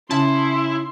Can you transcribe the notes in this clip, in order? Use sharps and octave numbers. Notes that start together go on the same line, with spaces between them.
C#3 E4 E5 A5 C6